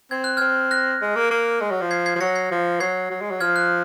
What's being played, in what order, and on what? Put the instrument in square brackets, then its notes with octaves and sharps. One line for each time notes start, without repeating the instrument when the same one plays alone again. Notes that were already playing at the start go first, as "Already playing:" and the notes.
[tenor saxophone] C4 [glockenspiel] G#6
[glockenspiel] F#6
[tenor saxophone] C4 [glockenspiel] F6 G#6
[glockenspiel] F#6 A#6
[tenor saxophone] G#3
A#3
A#3
G#3
F#3
F3
[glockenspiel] G#6 C7
G#6 C7
[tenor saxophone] F3
[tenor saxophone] F#3 [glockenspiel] A#6 C#7
[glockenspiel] G#6 C7
[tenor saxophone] F3
[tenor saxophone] F#3 [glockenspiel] G#6 C7
[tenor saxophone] F#3
G#3
F#3
[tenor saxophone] F3 [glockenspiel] F6 G#6
[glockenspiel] F#6